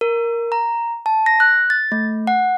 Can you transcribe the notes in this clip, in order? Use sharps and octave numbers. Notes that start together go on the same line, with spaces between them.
A#4
A#5
A5
A#6
F#6
A6
A3
F#5